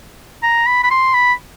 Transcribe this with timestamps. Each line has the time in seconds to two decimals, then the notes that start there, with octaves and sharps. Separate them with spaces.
0.43 A#5
0.67 B5
0.83 B5
0.91 C6
1.14 B5